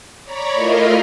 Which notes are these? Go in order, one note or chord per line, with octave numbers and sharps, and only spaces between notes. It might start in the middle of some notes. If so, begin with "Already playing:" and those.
C#5 D5 A#5 B5 C#6
A3 E4 F4 A#4 D#5 F5